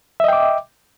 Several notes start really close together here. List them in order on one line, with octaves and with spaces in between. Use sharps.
E5 D#5 G5 D6